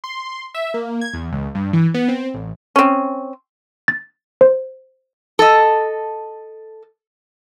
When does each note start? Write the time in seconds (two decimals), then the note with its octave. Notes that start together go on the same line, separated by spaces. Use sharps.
0.04 C6
0.54 E5
0.74 A#3
1.01 G#6
1.14 E2
1.32 C#2
1.55 G2
1.73 E3
1.94 B3
2.08 C4
2.34 A1
2.76 C4 C#4
3.88 A6
4.41 C5
5.39 A4 D#5